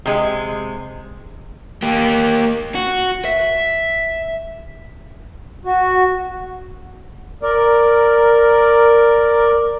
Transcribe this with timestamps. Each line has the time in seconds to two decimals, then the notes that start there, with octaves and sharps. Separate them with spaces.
0.06 C3 G#3
1.82 A#3 G4
2.75 F#4
3.25 E5
5.65 F#4
7.43 A#4 D5